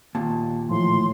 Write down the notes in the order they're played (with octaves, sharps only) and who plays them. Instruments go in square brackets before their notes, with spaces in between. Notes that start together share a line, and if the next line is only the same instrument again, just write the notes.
[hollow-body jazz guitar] D#2 A#2 [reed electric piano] A5
[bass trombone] A2 [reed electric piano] E3 F3 [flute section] C6